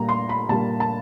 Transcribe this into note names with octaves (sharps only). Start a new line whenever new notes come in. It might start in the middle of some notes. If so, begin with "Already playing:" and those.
Already playing: A#2 G3 A#3 A#5
C6
B5
A#2 G3 A#3 A5
A5